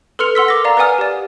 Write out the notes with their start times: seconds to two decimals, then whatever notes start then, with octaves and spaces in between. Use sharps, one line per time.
0.19 A4 B4 C6 F6 C#7 F7
0.35 F#5 C6 E6 B6
0.48 A#4 D6 A#6
0.65 D5 F5 A#5
0.77 B4 D5 F#5 G#5 D#6 F6
0.98 G4 D5